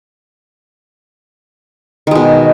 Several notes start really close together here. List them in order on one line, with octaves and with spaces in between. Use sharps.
D#3 G#3 B2